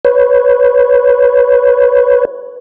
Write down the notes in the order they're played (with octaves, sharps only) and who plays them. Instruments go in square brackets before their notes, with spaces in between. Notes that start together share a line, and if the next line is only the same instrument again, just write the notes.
[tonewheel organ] B4 C#5